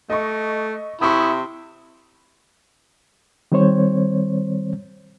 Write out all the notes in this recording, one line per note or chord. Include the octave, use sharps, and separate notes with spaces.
A3 D#5 C#6
C3 E4 C#6 D#6
D#3 G3 C4 C5 C#5